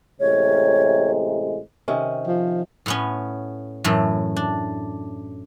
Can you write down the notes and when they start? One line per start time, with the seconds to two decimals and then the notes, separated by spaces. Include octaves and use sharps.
0.20 A1 C3 G#3 C#5
1.88 C3 D#3 C#4
2.27 F3
2.86 A2 B3 C#4
3.84 F#2 A2 E3 A3
4.37 D4